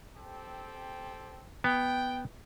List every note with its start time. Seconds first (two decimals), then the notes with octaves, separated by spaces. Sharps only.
0.16 C4 G4 A4
1.64 B3 G5